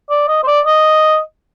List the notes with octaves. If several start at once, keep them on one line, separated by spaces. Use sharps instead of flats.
D5
D#5
C5
D5
D#5